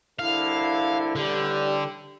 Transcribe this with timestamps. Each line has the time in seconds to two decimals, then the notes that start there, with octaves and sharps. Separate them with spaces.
0.19 C2 D3 E4 F5
1.15 A1 D3 G3